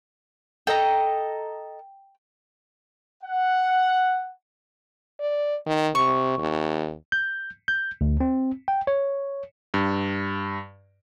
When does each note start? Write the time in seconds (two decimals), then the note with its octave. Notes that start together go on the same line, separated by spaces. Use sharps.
0.67 A4 D#5 G5 A#5
3.24 F#5
5.20 D5
5.66 D#3
5.95 C3 C#6
6.39 D#2
7.12 G6
7.68 G6
8.01 D2
8.20 C4
8.68 G5
8.87 C#5
9.74 G2